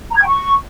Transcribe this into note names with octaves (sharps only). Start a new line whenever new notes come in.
A#5
G#6
G5
C#6